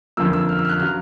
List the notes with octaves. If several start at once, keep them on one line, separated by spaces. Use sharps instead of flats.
G1 F2 C#3 F3 A#3 E6
E6
F6
E6
F6
F#6
C#3 F#3 F6